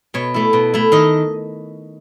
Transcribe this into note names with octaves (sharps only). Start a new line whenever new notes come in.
B2 C#5
A3 E4
B2
A3 E4
D#3 D#5